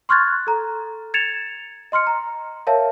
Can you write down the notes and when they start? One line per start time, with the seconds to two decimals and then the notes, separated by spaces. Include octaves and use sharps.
0.09 C6 C#6 F6 F#6 G#6 A6
0.47 A4 A#5
1.14 G#6 A6 C#7 E7 F7
1.92 D#5 C6 F6 C#7
2.07 A#5
2.67 A#4 C#5 E5 F5 A5